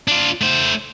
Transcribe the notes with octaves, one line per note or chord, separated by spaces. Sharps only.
D4 F4
A3 C5